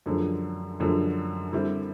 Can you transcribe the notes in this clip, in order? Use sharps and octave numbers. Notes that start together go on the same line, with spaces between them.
F#2 D3 F3 G#3
F#2 D3 F3 G#3
D3 G3 C4 E4